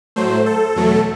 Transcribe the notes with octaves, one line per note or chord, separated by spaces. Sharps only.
A2 F#3 A3 C5
A4
E2 B2 F#3 A3